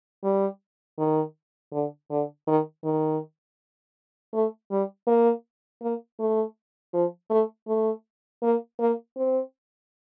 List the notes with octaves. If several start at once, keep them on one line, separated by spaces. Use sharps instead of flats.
G3
D#3
D3
D3
D#3
D#3
A3
G3
A#3
A#3
A3
F3
A3
A3
A#3
A#3
C4